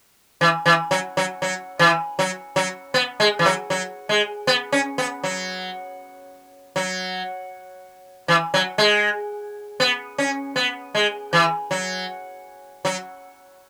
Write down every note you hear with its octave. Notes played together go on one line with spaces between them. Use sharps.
E3
E3
F#3
F#3
F#3
E3
F#3
F#3
B3
G#3
E3
F#3
F#3
G#3
B3
C#4
B3
F#3
F#3
E3
F#3
G#3
B3
C#4
B3
G#3
E3
F#3
F#3